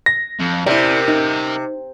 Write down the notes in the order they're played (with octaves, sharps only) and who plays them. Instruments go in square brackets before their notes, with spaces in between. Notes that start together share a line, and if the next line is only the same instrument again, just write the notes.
[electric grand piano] A#6
[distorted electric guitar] F2
[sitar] C3 [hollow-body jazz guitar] E4 D5 [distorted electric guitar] A#4 E5
[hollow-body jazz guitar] D#4